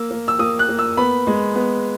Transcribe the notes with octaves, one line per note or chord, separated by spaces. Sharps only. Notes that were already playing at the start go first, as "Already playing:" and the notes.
Already playing: A#3 E6
A#3
E6
A#3 D#6
F#6
A#3
E6
B3 B5
G#3
B3